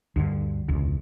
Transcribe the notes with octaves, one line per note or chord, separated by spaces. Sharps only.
D2 G2 D3
E1 C#2